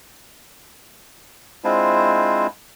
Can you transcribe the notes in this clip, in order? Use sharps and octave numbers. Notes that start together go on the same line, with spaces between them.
G#3 C4 D4 E4 F4 C5